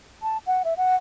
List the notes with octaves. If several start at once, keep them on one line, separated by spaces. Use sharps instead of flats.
A5
F#5
E5
F#5